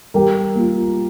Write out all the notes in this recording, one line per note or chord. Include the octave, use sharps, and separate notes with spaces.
G3 G4 A#4
A#3 F4